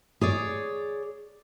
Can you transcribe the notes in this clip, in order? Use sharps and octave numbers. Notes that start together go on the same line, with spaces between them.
G#4 C#5 D5